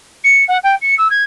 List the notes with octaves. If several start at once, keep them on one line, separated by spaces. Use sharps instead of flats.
C#7
F#5
G5
C#7
E6
G#6